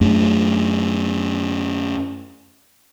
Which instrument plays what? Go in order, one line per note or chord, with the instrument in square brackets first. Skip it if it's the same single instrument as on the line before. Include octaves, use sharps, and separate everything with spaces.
[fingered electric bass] F#2 A3 D4